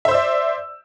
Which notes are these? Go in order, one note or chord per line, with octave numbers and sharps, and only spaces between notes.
C5 D5 E5 E6